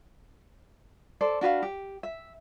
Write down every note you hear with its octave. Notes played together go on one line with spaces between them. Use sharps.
A4 C5 D5
D4 F#4 B4 F5
G4
E5